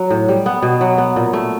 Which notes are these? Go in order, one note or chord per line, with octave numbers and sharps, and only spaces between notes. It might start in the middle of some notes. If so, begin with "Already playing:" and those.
Already playing: F#3
A2
G3
B3
B2
F#3
B3
A#2
A3